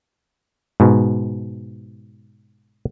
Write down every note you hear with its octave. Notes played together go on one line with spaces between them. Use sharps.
G#2 B2